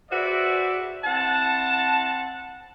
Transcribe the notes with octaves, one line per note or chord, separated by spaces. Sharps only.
F#4 G#4 B4 C5 D5 E5
C4 E4 F#5 A5